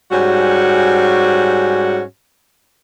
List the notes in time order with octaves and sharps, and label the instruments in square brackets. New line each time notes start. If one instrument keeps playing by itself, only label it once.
[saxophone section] G#2 G3 C#4 F#4